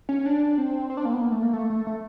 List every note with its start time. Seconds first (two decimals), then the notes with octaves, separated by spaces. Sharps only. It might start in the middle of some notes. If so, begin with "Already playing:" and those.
0.09 C#4
0.26 D4
0.58 C4
0.90 C4
0.97 D4
1.05 A#3
1.13 B3
1.21 A#3
1.32 A3
1.43 A#3
1.53 A3
1.70 A3
1.87 A3